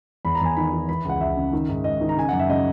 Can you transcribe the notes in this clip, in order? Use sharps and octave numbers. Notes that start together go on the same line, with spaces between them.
E2 B5
A#5
E2 G#5
D#3 B5
D#3
E3 B5
C#2 F#5
C#2 E5
C#3
D#3
G#2
G#2 D#5
D#3
A#5
C#3 G#5
F#2 F#5
E5
C#3 D#5